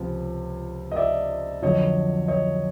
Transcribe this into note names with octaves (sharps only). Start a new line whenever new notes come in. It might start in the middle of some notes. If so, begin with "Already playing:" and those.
Already playing: C#2 C3 F3
D#5
D5 E5
F2 D3 F#3 C#5 D#5
C#5 D#5